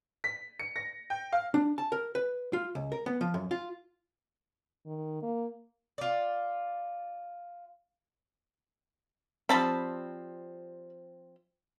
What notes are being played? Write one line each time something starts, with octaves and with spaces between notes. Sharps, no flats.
B6
C#7
A#6
G5
F5
D4
A5
A#4
B4
F4
C#2
A#4
B3
F3
F#2
F4
D#3
A#3
F4 D5
F3 G3 C4 A5 B5